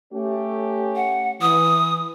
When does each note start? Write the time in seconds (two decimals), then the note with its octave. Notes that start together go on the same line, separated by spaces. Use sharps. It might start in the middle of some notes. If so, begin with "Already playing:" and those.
0.12 A3 C#4 G4
0.96 F#5
1.42 E3 D#6